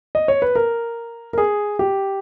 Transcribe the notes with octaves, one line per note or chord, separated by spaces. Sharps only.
D#5
C#5
B4
A#4
A#4
G#4
G4